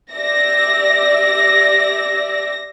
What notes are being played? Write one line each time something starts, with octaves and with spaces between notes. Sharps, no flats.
G4 D5 E5 A#6